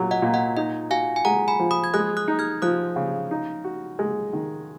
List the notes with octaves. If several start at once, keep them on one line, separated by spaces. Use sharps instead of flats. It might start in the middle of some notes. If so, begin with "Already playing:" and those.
Already playing: A#2 F#3
D#5 F#5
A#2
D#5 F#5
D#4 D#5
F#4 F5 G#5
G#5
G#3 F#5 A#5
G#5 B5
F3
B5 D#6
G#6
G#3 D#6 F#6
D#6 F#6
D#4
F6 G#6
F3 D#6 F#6
C#3
D#4
F#4
G#3
D#3